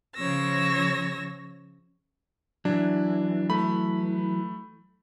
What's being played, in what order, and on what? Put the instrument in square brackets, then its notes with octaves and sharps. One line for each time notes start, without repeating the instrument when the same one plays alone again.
[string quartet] C#3 F3 C#5 E6 A#6
[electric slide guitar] E3 F#3 [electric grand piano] D4
[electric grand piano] A3 B5